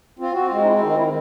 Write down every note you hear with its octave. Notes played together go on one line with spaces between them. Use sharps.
C4 F4
C4 F#4
F4
G#3
D#4
C4 E4
E4
D#3 D#4
D#3 E4